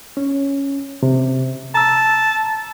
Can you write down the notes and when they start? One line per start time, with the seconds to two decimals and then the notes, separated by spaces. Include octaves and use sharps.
0.17 C#4
1.03 C3
1.74 A5 A#5 E6